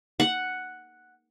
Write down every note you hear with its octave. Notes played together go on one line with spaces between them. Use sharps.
F#5